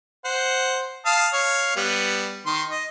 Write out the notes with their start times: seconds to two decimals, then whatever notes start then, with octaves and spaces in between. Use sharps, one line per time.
0.25 C5 F#5
1.06 F5 A5 D#6
1.33 C#5 F5
1.76 G3 B3
2.46 D#3 C6
2.70 D#5